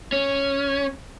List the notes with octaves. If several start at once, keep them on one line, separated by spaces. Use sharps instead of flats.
C#4